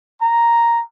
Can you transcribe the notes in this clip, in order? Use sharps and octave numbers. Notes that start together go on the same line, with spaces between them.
A#5